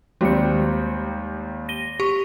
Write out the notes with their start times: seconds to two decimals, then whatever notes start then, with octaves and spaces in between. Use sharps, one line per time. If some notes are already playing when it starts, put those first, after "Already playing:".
0.21 D#2 G3 G#3 C4 C#7
1.69 A#6 D#7 G7
2.00 G4 C#6